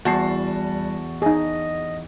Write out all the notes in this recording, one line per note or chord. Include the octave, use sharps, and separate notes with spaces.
E2 G3 F#4 A5 C7
D#4 G#4 D#5